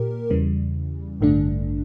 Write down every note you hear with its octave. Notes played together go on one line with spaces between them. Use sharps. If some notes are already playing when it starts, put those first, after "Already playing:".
Already playing: A#2 G4 A#4
E2 C#3 E3 G3
A1 G2 D3 A3 D4